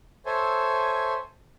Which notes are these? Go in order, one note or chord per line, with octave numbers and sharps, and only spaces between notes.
A4 C5 C#5 E5 G#5